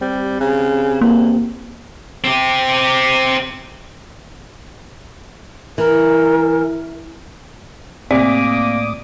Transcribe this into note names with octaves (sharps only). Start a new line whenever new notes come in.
G3 C4 G4
C#3
E2 A#3
C4 G4
E3 A#4
A2 C3 A#3 D5 D6 D#6